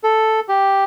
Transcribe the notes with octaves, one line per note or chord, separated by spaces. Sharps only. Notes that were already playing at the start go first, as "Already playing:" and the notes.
A4
G4